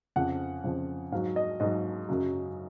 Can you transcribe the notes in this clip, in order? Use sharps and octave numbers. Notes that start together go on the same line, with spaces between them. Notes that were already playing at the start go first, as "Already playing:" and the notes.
F2 C#3 F3 F#5
F2 C#3 F3
G#2 F#3 F5
D#5
G#2 F#3 D#5
F#2 C#3 F#3